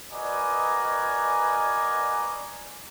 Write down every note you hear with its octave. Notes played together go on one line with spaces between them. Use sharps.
F#4 A#4 B4 D5 D#5 G#5